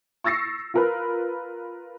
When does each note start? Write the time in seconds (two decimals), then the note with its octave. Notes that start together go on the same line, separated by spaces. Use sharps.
0.24 C#6 E6 A6 A#6 C7 C#7
0.74 F4 A#4 B4